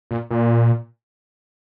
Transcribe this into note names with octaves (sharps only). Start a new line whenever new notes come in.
A#2
A#2